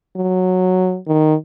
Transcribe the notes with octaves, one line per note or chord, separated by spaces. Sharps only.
F#3
D#3